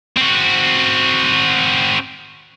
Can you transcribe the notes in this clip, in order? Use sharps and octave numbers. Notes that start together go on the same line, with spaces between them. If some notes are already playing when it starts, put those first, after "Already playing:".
C4 F#4